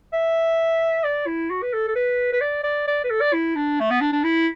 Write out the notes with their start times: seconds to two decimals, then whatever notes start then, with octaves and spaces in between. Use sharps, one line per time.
0.13 E5
1.04 D5
1.27 E4
1.50 F#4
1.63 B4
1.73 A4
1.88 A4
1.96 B4
2.33 B4
2.41 D5
2.64 D5
2.88 D5
3.04 B4
3.10 A4
3.21 D5
3.33 E4
3.55 D4
3.80 A3
3.91 B3
4.01 D4
4.13 D4
4.24 E4